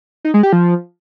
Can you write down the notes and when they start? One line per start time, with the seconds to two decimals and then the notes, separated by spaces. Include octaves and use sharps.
0.25 D#4
0.34 G#3
0.43 G4
0.53 F3